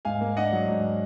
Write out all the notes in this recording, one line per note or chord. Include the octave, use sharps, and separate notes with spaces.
G#2 F5 G#5
A#3
D4 D#5 F#5
F#3
G#2